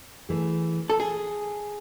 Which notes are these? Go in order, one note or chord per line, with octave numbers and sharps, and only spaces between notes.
E3 A3 E4 G#4
A4
G#4